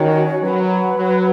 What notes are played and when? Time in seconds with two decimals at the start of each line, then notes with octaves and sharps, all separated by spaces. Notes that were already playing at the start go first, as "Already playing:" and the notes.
Already playing: D#3 C#4 F#4 C#5
0.41 F#3 B4 F#5 B5
0.96 F#3